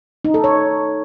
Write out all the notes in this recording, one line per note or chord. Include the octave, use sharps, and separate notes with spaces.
D#4
A4
C#5